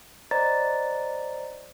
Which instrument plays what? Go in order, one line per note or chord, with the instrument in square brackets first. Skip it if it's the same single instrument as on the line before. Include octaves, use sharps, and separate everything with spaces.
[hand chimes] C5 D5 D#5 A#5 A6